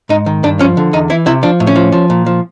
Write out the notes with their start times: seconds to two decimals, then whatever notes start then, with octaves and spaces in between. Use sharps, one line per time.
0.09 G#2 D#4
0.26 D#3
0.44 G2 D4
0.59 F3 C#4
0.77 D3
0.93 E2 D#4
1.10 E3 E4
1.26 C3 E4
1.43 F3 D4
1.60 A2
1.67 C#4
1.76 F3
1.92 F3
2.10 A#2
2.26 F3